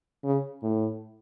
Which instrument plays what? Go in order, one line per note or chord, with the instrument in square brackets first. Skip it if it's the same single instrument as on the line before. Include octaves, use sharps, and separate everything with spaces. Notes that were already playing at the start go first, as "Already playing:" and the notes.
[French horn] C#3
A2